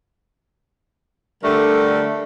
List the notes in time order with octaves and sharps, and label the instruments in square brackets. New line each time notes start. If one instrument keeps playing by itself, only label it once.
[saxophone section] D3 G3 A3 A#4